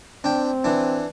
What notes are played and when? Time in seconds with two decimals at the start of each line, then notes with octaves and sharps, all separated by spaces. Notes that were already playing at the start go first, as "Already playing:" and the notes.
0.24 C4 D4 G5
0.64 E3 D4